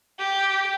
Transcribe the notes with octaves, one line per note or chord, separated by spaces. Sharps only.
G4